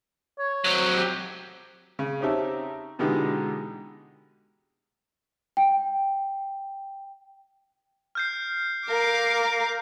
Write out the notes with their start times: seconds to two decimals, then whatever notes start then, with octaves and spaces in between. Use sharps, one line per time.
0.39 C#5
0.64 F#3 C4
0.97 G4
1.99 C#3
2.21 C4 C#4 D#4 G4 E5 A5
2.99 B2 D3 E3 G#3 D#4 G4
5.57 G5
8.15 F6 G6 C7
8.88 A#4 F5 D6